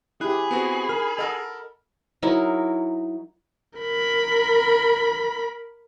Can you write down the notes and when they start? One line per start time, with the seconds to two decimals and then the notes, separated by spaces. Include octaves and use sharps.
0.21 E4 G4 G#4 B5 F#6
0.51 B3 C4 F#4
0.89 A#4 F6
1.19 A4 A#4 D#5 F#5
2.22 F#3 D#4 E4 A#4
3.79 A#4 B5